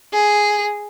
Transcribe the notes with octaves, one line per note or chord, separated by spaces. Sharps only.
G#4